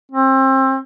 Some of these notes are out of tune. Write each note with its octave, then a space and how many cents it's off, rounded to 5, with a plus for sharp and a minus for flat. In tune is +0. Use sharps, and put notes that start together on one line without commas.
C4 +30